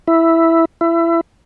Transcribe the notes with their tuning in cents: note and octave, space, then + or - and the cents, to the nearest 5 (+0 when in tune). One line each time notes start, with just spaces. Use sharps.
E4 +0
E4 +25